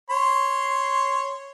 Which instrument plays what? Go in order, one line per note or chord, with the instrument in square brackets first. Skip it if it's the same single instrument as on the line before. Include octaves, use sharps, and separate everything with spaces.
[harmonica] C#5 C6